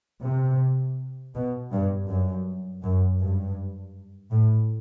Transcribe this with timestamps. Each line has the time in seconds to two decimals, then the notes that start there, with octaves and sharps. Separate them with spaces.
0.24 C3
1.35 B2
1.72 G2
2.08 F#2
2.83 F#2
3.20 G2
4.31 A2